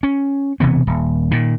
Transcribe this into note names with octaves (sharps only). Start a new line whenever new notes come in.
C#4
E1 C3 E3 B3
D#1
A#2 D#3